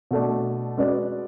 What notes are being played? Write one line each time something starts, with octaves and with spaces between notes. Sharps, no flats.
B2 A3 D4
G#3 C#4 F#4 B4 D5